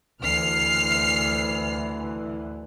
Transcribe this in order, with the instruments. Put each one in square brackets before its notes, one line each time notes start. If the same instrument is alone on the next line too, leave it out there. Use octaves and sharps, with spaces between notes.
[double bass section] D2 E3 [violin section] F6 C7